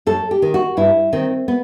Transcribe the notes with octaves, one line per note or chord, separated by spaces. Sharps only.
F#2 A4
G4
D#3
F#4
G2 E4
D#3 C4
B3